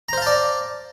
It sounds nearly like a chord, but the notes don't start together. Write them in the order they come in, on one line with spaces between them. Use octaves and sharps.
A#5 C5 F5 A5 D5